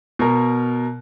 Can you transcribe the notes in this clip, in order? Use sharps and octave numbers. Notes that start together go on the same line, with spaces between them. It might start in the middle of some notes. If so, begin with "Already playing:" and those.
B2 A#4